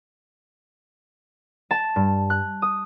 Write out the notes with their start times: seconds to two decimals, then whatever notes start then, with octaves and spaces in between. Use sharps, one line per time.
1.71 A5
1.96 G2
2.30 F#6
2.62 D#6